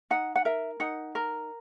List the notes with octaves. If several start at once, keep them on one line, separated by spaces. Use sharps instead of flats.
D#4 F#5
F#5
A#4 E5
D#4 F#5
A#4